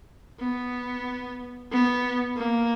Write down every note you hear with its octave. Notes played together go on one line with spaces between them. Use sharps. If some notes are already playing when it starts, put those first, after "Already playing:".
B3
B3
A#3